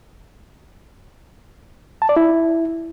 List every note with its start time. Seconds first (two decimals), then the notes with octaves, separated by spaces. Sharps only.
2.02 A5
2.09 D5
2.17 E4